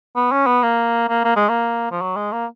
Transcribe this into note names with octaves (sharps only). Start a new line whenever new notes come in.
B3
C#4
B3
A#3
A#3
A#3
G#3
A#3
F3
F#3
G#3
A#3